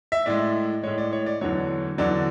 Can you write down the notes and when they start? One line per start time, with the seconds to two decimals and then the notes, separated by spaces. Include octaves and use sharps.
0.12 E5
0.26 A2 G#3 D5
0.83 A2 G#3 C#5
0.98 D5
1.13 C#5
1.26 D5
1.41 E2 D3 F#3 C#5
1.98 E2 D3 F#3 D5